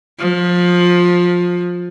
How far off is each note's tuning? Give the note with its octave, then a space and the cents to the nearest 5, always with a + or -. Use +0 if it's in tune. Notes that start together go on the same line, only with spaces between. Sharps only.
F3 +20